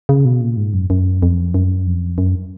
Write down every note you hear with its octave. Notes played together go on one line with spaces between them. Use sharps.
C#3
B2
A#2
G#2
F#2
F#2
F2
F#2
F2
F#2